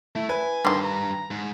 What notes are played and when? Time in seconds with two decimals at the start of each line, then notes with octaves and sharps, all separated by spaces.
0.16 A3 E4
0.29 B4 G#5
0.65 G2 D3 D#3 C6
0.84 A#5
1.31 G#2